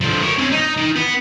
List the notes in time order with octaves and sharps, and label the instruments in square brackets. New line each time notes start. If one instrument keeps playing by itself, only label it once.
[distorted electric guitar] D3 F3
A#4 C#5
C4 C#4
D#4
D#3
B3